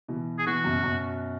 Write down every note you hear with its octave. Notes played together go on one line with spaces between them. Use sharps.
B2 E3
G#4
B2 E3 F#4
F#2 B2
F#2 B2